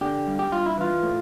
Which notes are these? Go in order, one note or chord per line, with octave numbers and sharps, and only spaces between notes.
D3 G4
G2
G4
G2 F4
E4
E3 F4
A2